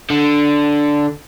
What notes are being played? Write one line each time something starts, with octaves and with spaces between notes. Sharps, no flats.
D3